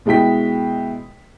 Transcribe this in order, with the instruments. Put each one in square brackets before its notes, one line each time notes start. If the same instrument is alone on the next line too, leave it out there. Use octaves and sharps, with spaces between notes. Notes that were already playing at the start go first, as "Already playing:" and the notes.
[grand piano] B2 G#3 E4 G5 B6